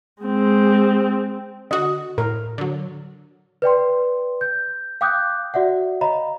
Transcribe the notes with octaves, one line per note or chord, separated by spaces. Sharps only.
G#3 C4
D3 F#4 D#5
A2 A#4
D3 F#3
B4 D5 G5 C6
G6
F5 G5 D6 D#6 F#6 G6
F#4 D5 E5 F#5
C#5 D#5 F5 A#5 B5